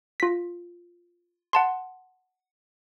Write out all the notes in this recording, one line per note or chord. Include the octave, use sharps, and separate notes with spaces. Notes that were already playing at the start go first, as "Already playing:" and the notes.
F4 B6
F#5 A5 C6